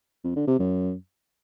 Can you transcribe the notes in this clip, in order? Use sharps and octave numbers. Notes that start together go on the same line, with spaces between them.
F2
D3
C3
F#2